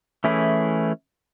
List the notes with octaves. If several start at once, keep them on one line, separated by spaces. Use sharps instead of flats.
E3 A3 C#4 E4 G#4